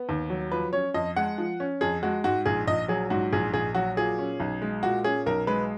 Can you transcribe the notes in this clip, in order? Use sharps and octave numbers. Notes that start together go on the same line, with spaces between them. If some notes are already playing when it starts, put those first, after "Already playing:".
Already playing: B3
D#2
F#3
F3 B4
C#4 C#5
F2 D#5
G#3 F#5
F3
C#4
F2 G#4
G#3 F#4
G#2 F#4
A#1 G#4
A#1 D#5
F#3 G#4
G#2 F#4
A#1 G#4
A#1 G#4
F#3 F#4
A#2 G#4
C#4
B1
G#3
A#2 F#4
C#4 G#4
B1 A#4
G#3 B4